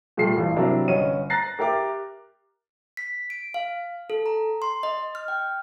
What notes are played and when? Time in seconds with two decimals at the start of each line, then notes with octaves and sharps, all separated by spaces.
0.17 A#2 G3 A3 C7
0.36 A1 G2
0.56 C3 F#3 D4 E4 A#4
0.88 G1 C#4 D#5 D#7
1.30 A#5 F#6 A6 A#6 C7
1.59 G4 A#4 E5 D6
2.97 B6
3.30 D7
3.54 F5
4.10 A4
4.26 A#5
4.62 C6
4.83 D#5
5.15 F6
5.28 G5